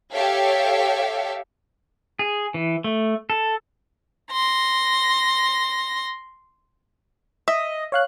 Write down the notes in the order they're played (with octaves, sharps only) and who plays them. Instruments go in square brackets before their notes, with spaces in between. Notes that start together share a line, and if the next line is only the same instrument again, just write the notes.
[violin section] G4 A4 C#5 E5 F5
[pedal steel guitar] G#4
E3
A3
A4
[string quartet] C6 A#6
[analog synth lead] D#5 [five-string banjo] E5
[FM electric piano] C#5 F5 F#6